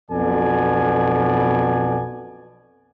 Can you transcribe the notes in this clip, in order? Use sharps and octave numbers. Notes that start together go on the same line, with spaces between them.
B1 F2 B2 A4 D5 G#5